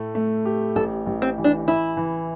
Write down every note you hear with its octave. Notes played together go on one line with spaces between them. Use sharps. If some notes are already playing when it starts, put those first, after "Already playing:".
Already playing: A2 A3
A3
G4
A1 A4
A1
C4
E3
D4
E3 E4
E3